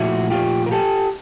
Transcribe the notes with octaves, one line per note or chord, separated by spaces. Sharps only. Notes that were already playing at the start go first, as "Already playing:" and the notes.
Already playing: A#2 F3 A3 E4 F#4
F4 G4
A#4
G4 A4